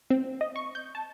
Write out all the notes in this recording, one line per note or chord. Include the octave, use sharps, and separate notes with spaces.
C4
D#5
C#6
G6
A5